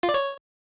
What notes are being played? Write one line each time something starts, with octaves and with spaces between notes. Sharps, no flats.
F4
D5
C#5